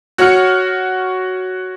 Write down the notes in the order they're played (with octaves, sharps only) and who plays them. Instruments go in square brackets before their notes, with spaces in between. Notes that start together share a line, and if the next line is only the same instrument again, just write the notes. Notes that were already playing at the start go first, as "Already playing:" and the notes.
[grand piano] F#4 C#5 F#5 F6 C#7